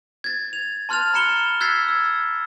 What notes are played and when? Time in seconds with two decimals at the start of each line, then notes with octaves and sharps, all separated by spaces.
0.24 G#6 A6
0.53 F7
0.89 A5 C6 F6 F#6 A6 F7
1.14 A#5 B5 F#6 C#7 E7 G7
1.60 E6 F#6 G#6 A6 B6 C7
1.88 E6